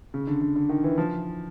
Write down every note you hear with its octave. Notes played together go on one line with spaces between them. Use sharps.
C#3
D3
D3
D3
D#3
E3
F3